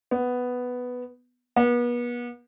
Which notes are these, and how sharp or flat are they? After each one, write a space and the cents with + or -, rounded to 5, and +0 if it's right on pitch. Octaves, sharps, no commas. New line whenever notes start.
B3 +5
B3 -35